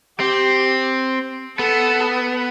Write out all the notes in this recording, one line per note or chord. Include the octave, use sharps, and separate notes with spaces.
C4 G4
B3 A4